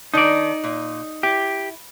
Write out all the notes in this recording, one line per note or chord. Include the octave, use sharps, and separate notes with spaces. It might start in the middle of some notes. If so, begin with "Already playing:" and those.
D#3 D4 D#4 D5
A#2
E4 G4